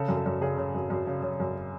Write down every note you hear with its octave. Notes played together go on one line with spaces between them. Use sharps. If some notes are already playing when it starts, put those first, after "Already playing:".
Already playing: C#3 A4
F#2
A4
F#2
C#3 G#4
C#3
F#2
F#2
C#3
C#3
F#2